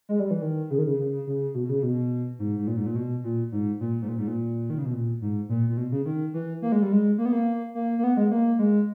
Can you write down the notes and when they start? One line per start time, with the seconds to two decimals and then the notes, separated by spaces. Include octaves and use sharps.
0.09 G#3
0.20 G3
0.31 E3
0.42 D#3
0.70 C#3
0.78 D#3
0.87 C#3
0.98 C#3
1.27 C#3
1.54 B2
1.69 C#3
1.83 B2
2.39 G#2
2.59 G#2
2.67 A#2
2.77 G#2
2.86 A#2
2.96 B2
3.24 A#2
3.52 G#2
3.80 A#2
4.02 G#2
4.09 A#2
4.18 G#2
4.28 A#2
4.70 D#3
4.78 C#3
4.86 B2
4.93 A#2
5.21 G#2
5.49 A#2
5.69 A#2
5.77 B2
5.92 C#3
6.05 D#3
6.34 E3
6.62 A#3
6.72 G#3
6.82 G3
6.93 G#3
7.18 A#3
7.25 B3
7.33 A#3
7.75 A#3
7.99 A#3
8.04 B3
8.17 G#3
8.31 A#3
8.59 G#3